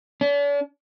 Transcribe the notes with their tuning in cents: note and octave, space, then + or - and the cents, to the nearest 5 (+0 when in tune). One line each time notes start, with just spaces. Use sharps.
D4 -45